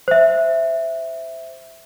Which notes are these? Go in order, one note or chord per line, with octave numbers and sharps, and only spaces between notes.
C5 E5